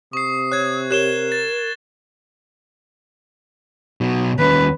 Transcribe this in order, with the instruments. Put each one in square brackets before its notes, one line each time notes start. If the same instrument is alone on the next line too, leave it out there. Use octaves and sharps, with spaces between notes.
[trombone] C3 [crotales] C#6 C7 [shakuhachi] D#6
[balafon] C#5 [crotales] F#6 G#6
[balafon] G4 C#5 [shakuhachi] A#4 [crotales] F#6 E7 G7
[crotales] A6
[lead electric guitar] B2 F#3
[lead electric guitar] D#2 C#4 [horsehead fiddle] B4